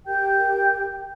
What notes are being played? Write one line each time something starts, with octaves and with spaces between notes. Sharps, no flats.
G4 A#4 G5 G6